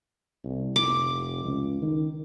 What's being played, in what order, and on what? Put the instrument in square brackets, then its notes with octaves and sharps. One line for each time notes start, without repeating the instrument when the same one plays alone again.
[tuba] C2
[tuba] F1 [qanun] D6
[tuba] C#2
D#3